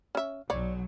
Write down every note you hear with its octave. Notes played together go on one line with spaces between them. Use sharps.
C#4 E5
B1 F#3 C#5 D5